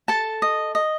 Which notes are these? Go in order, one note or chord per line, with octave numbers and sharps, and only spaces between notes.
A4 A5
D#5
D#5